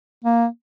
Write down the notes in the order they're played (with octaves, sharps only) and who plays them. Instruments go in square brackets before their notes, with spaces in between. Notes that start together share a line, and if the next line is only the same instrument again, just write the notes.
[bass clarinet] A#3